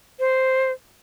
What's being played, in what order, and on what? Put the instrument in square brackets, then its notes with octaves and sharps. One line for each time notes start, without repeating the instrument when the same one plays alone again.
[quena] C5